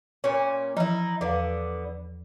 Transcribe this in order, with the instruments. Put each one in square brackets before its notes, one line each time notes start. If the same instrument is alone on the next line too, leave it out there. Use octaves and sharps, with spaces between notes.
[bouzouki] A#2 C#4
[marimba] E3 F3 [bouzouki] D#4 E4
[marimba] E2 F5 [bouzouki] D3 B3